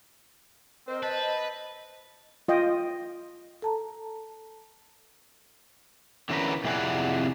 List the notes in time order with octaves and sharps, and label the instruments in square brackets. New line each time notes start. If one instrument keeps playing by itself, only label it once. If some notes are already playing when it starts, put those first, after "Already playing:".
[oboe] C4 [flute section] A#4 D#5 [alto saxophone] C5
[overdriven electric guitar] B4 [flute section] D#5 [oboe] A5
[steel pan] F4 D#5 G5
[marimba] A4 A5 A#5
[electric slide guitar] D3 E3 C#4 A#4 B4
F2 C3 E4 G#4 D5 F#5